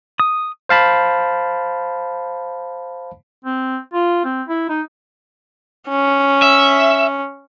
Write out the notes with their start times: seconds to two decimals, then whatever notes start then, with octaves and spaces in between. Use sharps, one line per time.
0.20 D#6
0.69 C5 F5 A5 B5
3.45 C4
3.94 F4
4.25 C4
4.49 E4
4.69 D#4
5.89 C#4
6.42 E5